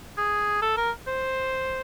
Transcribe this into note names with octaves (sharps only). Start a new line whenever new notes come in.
G#4
A4
A#4
C5